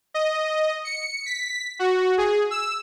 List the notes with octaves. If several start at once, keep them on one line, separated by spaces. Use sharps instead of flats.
D#5
C#7
B6
F#4
G#4
E6